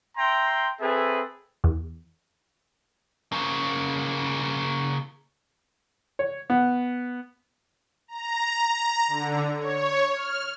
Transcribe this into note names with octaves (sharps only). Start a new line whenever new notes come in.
E5 G5 A#5 C6
C4 G#4 A4 B4 E5 G#5
E2
C#3 A#3
C#5
B3
A#5
D3
C#5
F6